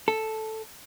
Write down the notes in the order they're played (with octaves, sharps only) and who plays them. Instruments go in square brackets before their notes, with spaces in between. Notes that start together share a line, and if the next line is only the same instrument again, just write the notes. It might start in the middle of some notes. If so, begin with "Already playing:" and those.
[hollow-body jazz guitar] A4